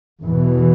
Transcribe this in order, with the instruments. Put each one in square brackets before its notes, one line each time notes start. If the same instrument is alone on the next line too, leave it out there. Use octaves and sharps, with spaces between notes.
[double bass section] E2 B2 E3